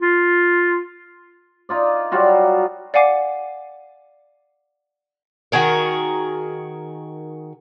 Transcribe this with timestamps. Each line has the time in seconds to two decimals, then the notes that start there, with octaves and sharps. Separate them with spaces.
0.01 F4
1.69 D#4 F4 D5
2.12 F#3 G3 F4 F#4
2.94 D5 F5 F#5 G#5 D6 C7
5.52 D#3 F#4 G#4 A#4